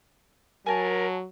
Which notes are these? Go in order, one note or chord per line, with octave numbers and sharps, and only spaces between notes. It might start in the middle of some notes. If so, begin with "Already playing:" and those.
F#3 A#4 G#5 A5